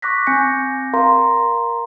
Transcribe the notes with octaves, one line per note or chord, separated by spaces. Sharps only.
C#6 D6 F#6 A#6 B6
C4 G#5 D6 G6 A#6 C#7
A#4 F5 A#5 C6